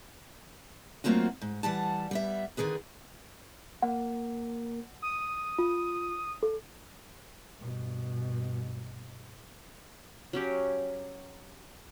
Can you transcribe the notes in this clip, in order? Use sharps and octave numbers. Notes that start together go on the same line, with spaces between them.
F#3 A3 A#3 C4 F4 F#4
G#2
E3 G3 F#5 A5
G3 B3 E5
D3 D#3 D4 G#4 B4
A#3 F#5
D#6
F4
A4
G2 B2
F#3 C#4 G4